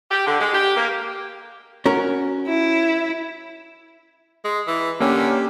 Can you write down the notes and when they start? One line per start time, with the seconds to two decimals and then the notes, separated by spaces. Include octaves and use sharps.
0.11 G4
0.26 D3
0.40 G#3
0.54 G4
0.76 A#3
1.86 C#4 F#4 A#4
2.47 E4
4.44 G#3
4.67 E3
5.00 D3 A#3 C#4 G4